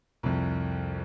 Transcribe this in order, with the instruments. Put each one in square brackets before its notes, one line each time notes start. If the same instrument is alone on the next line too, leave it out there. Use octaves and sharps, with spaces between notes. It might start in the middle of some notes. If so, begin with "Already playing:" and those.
[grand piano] C2 F2